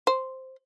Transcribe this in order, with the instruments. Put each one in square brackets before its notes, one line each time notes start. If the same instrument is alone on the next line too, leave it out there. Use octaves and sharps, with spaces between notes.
[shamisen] C5